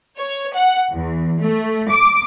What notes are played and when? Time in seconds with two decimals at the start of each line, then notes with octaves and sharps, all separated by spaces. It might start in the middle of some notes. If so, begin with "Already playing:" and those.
0.17 C#5
0.54 F#5
0.92 E2
1.40 A3
1.90 D6